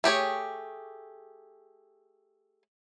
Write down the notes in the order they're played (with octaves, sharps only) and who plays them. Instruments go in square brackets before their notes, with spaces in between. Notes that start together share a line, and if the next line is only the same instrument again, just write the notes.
[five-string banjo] A3 G4 G#4 C#5